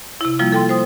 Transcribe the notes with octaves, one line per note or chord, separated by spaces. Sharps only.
C3 E4
F3 G3 A#3 E4 F4
A4 G5 C6
C5 D#6